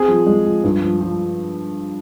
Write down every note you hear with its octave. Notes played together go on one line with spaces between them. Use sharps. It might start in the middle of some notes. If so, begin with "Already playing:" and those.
Already playing: C4 G#4
F3
G#3
F3
G2
F3
F3